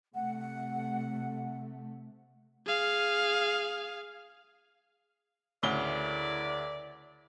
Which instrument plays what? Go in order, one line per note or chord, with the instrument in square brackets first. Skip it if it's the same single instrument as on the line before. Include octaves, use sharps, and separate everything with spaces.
[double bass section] C3 A3 [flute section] F#5
[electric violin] G#4 F5
[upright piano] D2 C#3 G7 [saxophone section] E4 A#4 D5